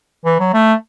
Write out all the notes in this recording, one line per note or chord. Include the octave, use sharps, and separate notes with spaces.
E3
F#3
A3